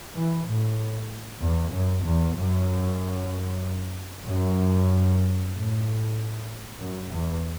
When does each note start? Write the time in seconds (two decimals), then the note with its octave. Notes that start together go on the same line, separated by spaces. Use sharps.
0.15 E3
0.47 A2
1.41 E2
1.73 F#2
2.05 E2
2.36 F#2
4.26 F#2
5.53 A2
6.80 F#2
7.12 E2